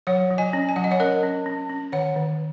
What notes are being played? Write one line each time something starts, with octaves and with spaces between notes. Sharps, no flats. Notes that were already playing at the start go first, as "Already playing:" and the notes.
F#3 C#5 F#5
F#3
D#5 G#5
C#4
G#5
F#3 F#5
D#5
C#5 F#5
C#4 A#4 D#5
C#4
C#4
C#4
D#3 C#5 F#5
D#3